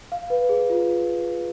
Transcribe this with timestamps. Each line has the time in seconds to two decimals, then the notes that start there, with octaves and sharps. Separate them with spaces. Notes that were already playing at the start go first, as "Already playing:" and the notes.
0.12 F5
0.30 B4
0.49 G#4
0.70 F4